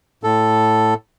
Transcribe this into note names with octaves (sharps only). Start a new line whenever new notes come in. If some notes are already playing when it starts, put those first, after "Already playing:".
A2 A4